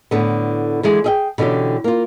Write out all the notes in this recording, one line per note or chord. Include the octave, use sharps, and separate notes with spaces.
A2 D3 B3
D3 E3 G#3
G#4 E5 G5
B2 D3 E3 C#4 G4
A#3 F4